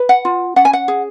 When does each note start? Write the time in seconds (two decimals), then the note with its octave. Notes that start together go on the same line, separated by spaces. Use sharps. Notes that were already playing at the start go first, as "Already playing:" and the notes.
Already playing: B4
0.09 F#5
0.25 F4
0.56 C#4 F#5
0.65 G#5
0.73 F#5
0.88 G#4